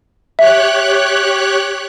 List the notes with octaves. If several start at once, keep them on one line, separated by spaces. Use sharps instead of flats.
G4 C#5 E5 F#6